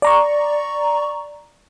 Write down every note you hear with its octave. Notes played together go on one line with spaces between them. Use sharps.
D5 A#5 C#6